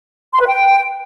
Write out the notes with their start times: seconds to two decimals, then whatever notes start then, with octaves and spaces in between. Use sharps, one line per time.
0.33 C6
0.40 B4
0.47 G5